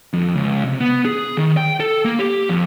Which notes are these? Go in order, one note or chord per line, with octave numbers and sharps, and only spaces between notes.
F2
C#2
C3
B3
G#4
D#3
G5
A4
A#3
G4
F2